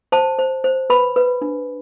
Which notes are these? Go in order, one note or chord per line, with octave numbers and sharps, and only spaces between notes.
C5 A5
C5
C5
B4 B5
B4
D4